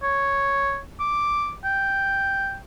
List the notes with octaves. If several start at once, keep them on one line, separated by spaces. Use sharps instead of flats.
C#5
D6
G5